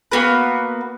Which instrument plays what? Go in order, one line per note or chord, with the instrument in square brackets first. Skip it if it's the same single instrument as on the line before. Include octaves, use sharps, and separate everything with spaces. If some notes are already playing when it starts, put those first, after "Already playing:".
[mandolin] A#3 B3 F#4 B4